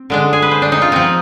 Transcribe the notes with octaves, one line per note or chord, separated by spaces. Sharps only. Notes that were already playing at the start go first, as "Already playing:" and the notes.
Already playing: C4
D3 G#3 D4
G#4
B4
C5
D4
D#4
F4
F3 C4 D#4